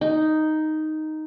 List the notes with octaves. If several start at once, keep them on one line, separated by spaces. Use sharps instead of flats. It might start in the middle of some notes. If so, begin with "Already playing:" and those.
D#4